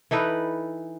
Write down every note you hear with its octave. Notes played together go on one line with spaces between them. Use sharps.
E3 D#4 A4 B4